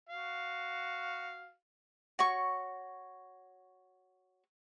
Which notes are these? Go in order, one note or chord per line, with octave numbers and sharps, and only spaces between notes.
F#4 F5
F#4 C#5 C#6